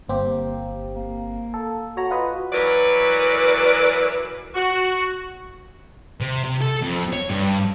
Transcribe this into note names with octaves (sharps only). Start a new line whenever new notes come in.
G1 A#3 C4 G4
A#3
A4
F#4 C#5 A#5
F4 B4 D#5
E3 F#3 A#4 B4 D5
F#4
C3
C3
A4
F2
C#5
G2